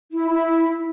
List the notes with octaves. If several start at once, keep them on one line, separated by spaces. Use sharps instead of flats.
E4
E4